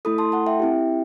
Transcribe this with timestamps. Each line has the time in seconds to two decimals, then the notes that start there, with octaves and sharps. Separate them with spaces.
0.05 A3 E4 A4 B5 D#6
0.18 A5 C6
0.32 F#5 A5
0.47 E5 G5
0.60 C4 E4 G4